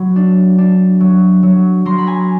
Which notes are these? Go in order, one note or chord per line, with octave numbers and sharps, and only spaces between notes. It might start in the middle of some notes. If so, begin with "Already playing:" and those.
Already playing: F#3 B5
D4
D4
F#3
F#3
F#3 A#5 C6
B5
G#5 A#5